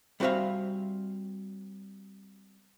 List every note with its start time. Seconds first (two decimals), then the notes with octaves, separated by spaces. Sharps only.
0.20 G3 C4 F#4 C5 E5 F5